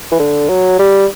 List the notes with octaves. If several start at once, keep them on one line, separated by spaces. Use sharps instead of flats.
E3
D3
F#3
G3